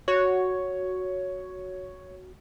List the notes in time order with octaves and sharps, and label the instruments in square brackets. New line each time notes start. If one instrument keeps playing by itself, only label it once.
[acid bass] F#4 [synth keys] C#5